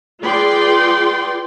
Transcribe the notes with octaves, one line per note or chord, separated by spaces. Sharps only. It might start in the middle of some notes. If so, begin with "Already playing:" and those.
F4 G#4 B4 D5 G5 C6